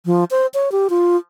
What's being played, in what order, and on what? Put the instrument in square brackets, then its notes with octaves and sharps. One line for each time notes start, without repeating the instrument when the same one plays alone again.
[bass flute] F3
C5
C#5
G4
F4